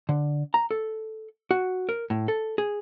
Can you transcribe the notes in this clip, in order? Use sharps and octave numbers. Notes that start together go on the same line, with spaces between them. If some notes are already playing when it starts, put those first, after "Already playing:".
D3
A#5
A4
F#4
A#4
A2
A4
G#4